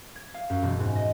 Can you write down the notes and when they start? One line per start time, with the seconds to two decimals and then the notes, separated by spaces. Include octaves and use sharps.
0.15 G#6
0.34 F5
0.50 F#2
0.62 E1
0.80 G#2
0.96 D#5